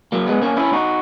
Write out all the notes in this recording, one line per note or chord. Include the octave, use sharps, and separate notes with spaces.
F#3 A#3
G#3 B3
A#3 C#4
C#4 E4
D#4 F#4